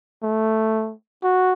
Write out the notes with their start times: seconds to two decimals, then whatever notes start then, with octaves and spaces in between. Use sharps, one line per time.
0.23 A3
1.23 F#4